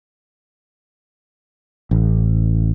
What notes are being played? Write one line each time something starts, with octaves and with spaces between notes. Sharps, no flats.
A1